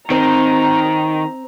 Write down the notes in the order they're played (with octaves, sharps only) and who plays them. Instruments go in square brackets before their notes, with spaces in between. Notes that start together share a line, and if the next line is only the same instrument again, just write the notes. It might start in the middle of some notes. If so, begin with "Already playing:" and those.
[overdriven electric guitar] D#3 [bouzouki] C4 C5 [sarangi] A#5